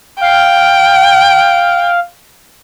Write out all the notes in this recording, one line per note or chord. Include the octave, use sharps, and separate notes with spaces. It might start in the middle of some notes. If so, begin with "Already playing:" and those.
F5 G5